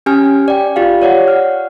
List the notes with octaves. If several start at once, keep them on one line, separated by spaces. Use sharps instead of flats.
C#4 G4 G#5 F6
D5 G5
F4 G4 F5
C#5 D5 F#5
F#5 F6